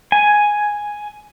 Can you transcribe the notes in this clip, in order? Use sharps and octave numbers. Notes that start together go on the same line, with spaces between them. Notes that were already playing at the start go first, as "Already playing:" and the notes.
G#5